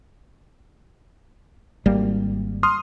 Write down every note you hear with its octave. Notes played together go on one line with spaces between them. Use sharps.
G#1 G3 A#3
C6 D#6 F6